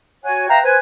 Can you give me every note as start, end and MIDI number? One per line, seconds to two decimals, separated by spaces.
0.25 0.49 66
0.25 0.49 73
0.25 0.49 78
0.25 0.49 80
0.49 0.59 71
0.49 0.59 76
0.49 0.59 77
0.49 0.59 79
0.49 0.59 82
0.64 0.78 71
0.64 0.78 72
0.64 0.78 80